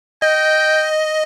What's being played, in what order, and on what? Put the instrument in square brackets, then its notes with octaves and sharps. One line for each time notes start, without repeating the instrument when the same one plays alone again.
[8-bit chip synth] D#5 [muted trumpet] G5